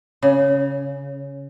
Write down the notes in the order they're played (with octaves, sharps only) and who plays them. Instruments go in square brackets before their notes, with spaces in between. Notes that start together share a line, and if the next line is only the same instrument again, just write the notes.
[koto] C#3